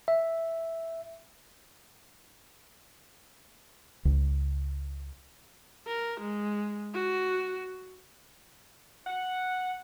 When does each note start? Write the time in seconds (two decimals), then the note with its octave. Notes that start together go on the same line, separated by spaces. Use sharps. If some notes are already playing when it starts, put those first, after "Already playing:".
0.08 E5
4.05 C#2
5.87 A#4
6.21 G#3
6.95 F#4
9.07 F#5